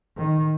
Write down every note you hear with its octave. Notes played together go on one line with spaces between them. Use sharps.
D#3